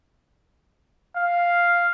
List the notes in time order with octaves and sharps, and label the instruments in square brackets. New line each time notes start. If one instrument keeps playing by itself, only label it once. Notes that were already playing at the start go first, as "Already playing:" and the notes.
[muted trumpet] F5